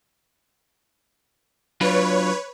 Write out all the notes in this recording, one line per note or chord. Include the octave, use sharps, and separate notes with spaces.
F#3 D4 F4 B4 C#5